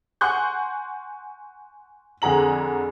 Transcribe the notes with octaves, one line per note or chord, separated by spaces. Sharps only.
F#5 G#5 C6 C#6 F#6 G6
F2 D3 G#4 A#5 F#7